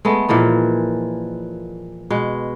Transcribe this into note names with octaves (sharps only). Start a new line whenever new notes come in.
G#3 A3 B3
A#2 E3 F3 G#3
B2 G#3